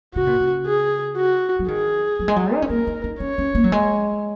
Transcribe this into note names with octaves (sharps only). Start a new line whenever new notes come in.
C#3 F#4
A#2
C#3
G#4
F#4
F#3
D#3 G#4
F#3
G#3
F#3
D#4
C#4
A#3 A#4
D#4
D#4
C#4 C#5
C#4
A#3
F#3
G#3